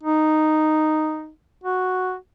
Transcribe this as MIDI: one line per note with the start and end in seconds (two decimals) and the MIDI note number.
0.04 1.31 63
1.64 2.15 66